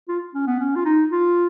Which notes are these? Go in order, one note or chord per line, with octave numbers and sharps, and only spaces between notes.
F4
C#4
B3
C#4
F4
D#4
F4